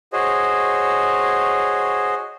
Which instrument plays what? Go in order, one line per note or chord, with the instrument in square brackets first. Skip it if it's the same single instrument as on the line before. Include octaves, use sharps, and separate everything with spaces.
[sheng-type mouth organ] F#4 G#4 C5 C#5 D#5